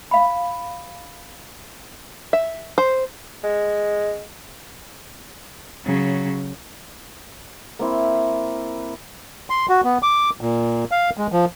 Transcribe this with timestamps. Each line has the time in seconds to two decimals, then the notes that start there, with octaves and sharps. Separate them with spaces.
0.11 F5 B5
2.33 E5
2.78 C5
3.44 G#3
5.84 C#3 F#3
7.79 A#3 C4 E4
9.50 C6
9.69 F#4
9.84 B3
10.03 D6
10.41 A#2
10.91 F5
11.17 G#3
11.32 F3